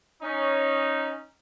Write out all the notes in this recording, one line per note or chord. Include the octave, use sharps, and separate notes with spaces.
C#4 D#4